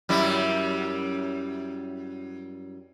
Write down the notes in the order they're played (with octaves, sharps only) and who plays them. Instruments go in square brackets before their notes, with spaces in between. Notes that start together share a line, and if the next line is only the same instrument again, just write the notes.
[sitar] F#2 G3 E4